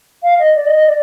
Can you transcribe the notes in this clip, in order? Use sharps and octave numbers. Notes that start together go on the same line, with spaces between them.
F5
D#5
D5
D#5
D#5
D5